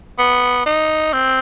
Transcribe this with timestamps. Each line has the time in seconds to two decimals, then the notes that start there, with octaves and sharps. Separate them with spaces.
0.19 B3
0.66 D#4
1.13 C4